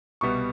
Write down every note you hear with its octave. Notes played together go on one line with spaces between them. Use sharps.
C2 B2 G3 B3 C#6